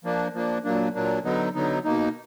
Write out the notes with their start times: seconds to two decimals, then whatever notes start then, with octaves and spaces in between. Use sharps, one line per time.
0.04 F3 A#3 D4
0.34 F3 A#3 D4
0.64 A#2 F#3 A#3 D4
0.95 A#2 F#3 A#3 D4
1.25 D3 F#3 B3 D#4
1.55 D3 F#3 B3 D#4
1.85 B2 A#3 D#4